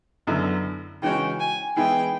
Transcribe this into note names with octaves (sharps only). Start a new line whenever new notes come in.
F#2 D3 F#3 B3 E4
C#3 E3 G#3 C#4 F#4 G5
G#5
E3 G#3 B3 E4 G#4 G5